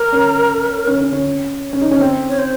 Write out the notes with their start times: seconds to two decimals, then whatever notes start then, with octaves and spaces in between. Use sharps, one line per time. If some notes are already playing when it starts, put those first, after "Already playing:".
Already playing: A#4
0.13 C#4
0.87 C#4
1.01 C#4
1.13 C#4
1.73 C#4
1.81 D#4
1.91 C#4
2.00 C4
2.29 C#5
2.38 C5